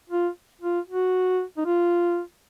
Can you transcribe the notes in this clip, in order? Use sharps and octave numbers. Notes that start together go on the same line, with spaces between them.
F4
F4
F#4
D#4
F4